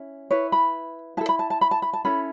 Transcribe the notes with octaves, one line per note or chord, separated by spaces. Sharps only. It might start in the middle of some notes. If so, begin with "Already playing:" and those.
Already playing: C#4 E4
E4 B4 C#5
B5
E4 A4 A5
B5
A5
A5
B5
A5
B5
A5
C#4 E4 A4 B5